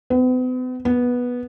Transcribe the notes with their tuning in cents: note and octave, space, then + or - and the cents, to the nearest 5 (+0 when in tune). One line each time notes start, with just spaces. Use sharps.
B3 +45
B3 -10